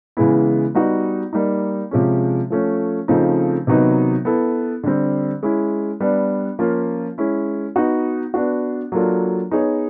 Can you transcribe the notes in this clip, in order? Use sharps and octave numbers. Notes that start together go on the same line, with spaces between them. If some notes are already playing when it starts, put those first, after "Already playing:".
C#3 E3 G#3 B3 E4
G3 B3 D#4 F#4
G3 A#3 D#4
C3 F3 G#3 C#4
F3 A3 C#4
C#3 F3 A3 C4 D#4
C3 D#3 F#3 B3 D#4
B3 E4 A4
D3 G3 C4
G#3 C#4 E4
G3 B3 D4
F3 A#3 C#4 F4
G#3 C#4 E4
B3 D#4 F#4
B3 D4 F#4
F#3 A#3 D4 F4 A4
B3 D#4 G#4 C#5